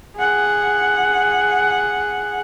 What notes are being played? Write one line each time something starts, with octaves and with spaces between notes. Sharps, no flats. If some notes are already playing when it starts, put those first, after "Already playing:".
G#4 F#5